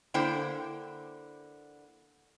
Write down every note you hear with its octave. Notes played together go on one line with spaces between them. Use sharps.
D3 A#3 E4 C5 G5